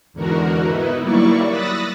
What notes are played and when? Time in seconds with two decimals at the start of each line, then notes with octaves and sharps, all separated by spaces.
0.13 E2 G#2 D3 F#4 A#4
0.66 B3 D#4 E4 B4
1.01 F#3 G3 A#3 E4 D5 C#6
1.48 B5 D#6 E6 F#6 A6 A#6